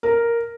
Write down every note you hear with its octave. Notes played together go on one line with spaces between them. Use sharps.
A#4